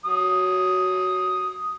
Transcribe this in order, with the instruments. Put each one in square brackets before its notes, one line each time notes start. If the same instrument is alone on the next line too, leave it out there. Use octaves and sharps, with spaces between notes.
[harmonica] F#3 D#6